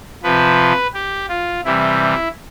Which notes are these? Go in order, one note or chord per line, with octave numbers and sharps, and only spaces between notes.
C3 F3 B4
G4
F4
C3 E3 G3 E4